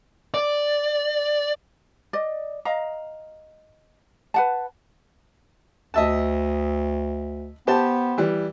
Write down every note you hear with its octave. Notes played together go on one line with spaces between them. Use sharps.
D5
D5 D#5
D#5 F5 A#5
B4 F#5 A5
D2 D#5 E5 A5
B3 G4 C5 A5
E3 G3